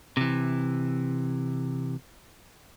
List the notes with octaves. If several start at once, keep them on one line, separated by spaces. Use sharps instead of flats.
C3 E3